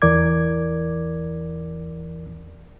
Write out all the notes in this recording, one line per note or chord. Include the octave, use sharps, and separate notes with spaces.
E2 E3 A#4 D5 D6 G#6